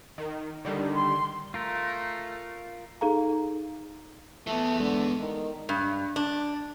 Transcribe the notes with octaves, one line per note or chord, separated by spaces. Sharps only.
D#3
D3 D#3 G3
C6
A3 F4 A#4
D#4 G#4 A4 F5 A#5
E3 A3 B3
D3 G#3 A4
D#3
G2
D4